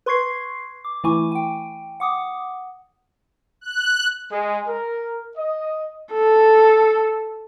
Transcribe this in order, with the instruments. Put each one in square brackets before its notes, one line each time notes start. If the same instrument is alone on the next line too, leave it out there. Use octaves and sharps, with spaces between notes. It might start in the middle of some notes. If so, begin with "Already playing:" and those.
[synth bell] B4 C6 C#6 G#6 C7
D6
E3 A3 E4 G#5 C#6 D6
G5 G#5
F#5 D6 D#6
[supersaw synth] F#6
[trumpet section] G#3
A#4
D#5
[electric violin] A4